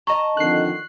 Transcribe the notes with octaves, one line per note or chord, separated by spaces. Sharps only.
D#5 A5 A#5 C#6
F2 D3 D#3 F#6 C7